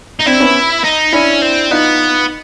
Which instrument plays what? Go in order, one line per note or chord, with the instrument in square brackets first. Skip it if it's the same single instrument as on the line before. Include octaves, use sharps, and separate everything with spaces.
[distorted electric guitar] D#4
[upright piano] C4 D4 [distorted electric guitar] E4
[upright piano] B3 C#4
[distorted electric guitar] D#4
[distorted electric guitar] C#4 [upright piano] D4 E4
[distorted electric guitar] C4
[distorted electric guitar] B3 [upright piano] D#4 F4